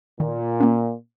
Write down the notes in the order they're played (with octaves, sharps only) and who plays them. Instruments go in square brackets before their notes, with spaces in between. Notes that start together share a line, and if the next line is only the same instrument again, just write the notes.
[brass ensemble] A#2 [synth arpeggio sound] D#3
[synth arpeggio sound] A#3 C#4